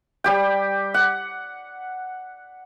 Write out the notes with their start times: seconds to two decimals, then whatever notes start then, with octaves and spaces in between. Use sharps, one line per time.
0.24 G3 G4 G5
0.94 F#5